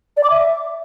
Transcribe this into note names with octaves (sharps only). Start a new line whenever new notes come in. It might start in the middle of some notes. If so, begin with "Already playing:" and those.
D5
D6
E5